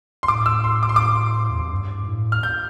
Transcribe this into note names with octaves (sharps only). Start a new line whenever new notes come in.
C6
A2 D6
E6
C6
D6
C6
D6
E2
F2
G2
G2
A2
F6
G6